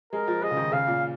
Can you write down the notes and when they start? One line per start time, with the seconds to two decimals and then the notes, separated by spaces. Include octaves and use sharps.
0.13 G#3 A#4
0.28 F3
0.42 G#3 D#5
0.51 C#3
0.57 D#3
0.72 C#3 F5
0.87 A#2